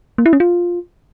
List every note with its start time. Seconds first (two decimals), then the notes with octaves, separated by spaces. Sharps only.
0.18 A#3
0.26 E4
0.33 C#4
0.40 F4